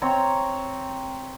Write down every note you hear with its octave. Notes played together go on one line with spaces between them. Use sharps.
C4 C#5 A#5